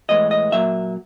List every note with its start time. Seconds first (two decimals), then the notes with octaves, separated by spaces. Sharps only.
0.09 A2 E3 G#3 B3 D#5
0.31 D#5
0.52 A#2 F#3 A#3 E5